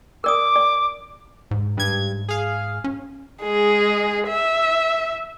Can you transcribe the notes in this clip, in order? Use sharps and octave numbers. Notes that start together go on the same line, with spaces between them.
A#4 D5 D6 D#6
D5
G#2
G2 G#6
G#4 F5
C#4
G#3 G#4
E5